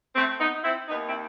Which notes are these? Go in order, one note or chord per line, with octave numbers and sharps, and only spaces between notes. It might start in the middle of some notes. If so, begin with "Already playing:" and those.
A3 C4
B3 D#4
C4 E4
D#2 D#3 B3 D#4
C4 E4